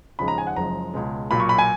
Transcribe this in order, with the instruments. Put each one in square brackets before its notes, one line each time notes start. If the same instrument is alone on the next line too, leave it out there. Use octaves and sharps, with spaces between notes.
[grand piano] D#2 C#3 F3 G#3 B5
A#5
G#5
F#5
F#1 F#2 F3 G#3 A#5
C#2 B2 G#3
B1 A#2 F#3 B5
C#6
B5
G#5